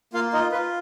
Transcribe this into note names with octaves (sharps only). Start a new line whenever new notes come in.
A#3 F4 F5
D#4 F4 D#5
F4 B4